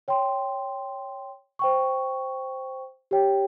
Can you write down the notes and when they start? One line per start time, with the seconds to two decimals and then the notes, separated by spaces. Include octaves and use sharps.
0.08 C#5 G5 C6
1.59 C5 G5 C#6
3.11 G4 C#5 G5